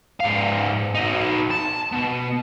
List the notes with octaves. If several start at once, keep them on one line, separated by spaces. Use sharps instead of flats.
G#2 F5
D#4 F#4
A5
B2